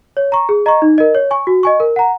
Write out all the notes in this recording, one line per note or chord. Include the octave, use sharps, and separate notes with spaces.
C#5
A#5 C#6
G#4
D#5 A#5 C#6
D#4
A#4 D#5
C#5
G#5 C#6
F#4
D#5 G#5 C#6
A#4
F#5 A#5